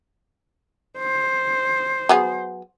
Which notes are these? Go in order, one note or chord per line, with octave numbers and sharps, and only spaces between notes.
C5
F#3 B3 G#4